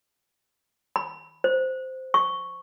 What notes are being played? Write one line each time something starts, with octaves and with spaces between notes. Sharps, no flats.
B5
C5
C#6